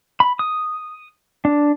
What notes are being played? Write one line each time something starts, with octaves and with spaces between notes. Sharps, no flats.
B5
D#6
D4